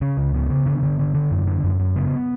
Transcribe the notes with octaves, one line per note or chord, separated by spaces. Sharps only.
C#3 C#4
C#2
C#3 B3
C#3
D3
D3
D3
D3
F#2
D3
F#2
F#2
C#3 B3